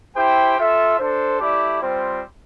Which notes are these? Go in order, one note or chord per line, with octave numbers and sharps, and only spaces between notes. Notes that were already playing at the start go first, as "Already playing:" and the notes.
E4 G4 C5 G5
F4 A4 E5
D4 A4 C5
A3 E4 G4 D5
G3 C4 F4 C5